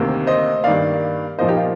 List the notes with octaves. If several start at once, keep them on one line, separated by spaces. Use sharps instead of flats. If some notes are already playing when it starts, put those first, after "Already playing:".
Already playing: D2 C3 D#3 A#3
C5 D#5
G2 D#3 A#3 D5 F5
A#2 F3 A#3 C5 D#5
D#4 G4
F4